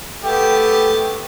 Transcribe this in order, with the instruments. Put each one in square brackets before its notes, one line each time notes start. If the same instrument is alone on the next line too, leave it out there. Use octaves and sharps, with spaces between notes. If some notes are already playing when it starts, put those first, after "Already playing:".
[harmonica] A3 B3 G4